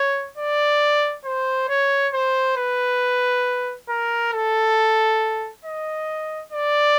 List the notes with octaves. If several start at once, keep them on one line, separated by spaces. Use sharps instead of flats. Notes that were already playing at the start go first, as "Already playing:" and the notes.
Already playing: C#5
D5
C5
C#5
C5
B4
A#4
A4
D#5
D5